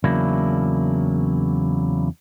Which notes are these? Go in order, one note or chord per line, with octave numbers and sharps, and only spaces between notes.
E2 C#3 F#3 A#3 D4 E4